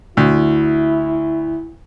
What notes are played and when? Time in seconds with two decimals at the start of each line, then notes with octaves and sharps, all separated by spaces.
0.17 D2 E4